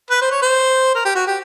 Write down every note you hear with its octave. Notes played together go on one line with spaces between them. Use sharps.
B4
C5
C#5
C5
A#4
G4
F#4
G4